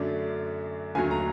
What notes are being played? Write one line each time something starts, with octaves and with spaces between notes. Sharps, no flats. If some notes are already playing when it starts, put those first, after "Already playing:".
Already playing: F#2 D3 F#3 A3 D5
D#2 D3 F#3 A3 G#5
A#5